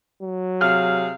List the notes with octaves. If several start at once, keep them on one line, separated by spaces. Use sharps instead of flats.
F#3
C3 G#4 F5 F6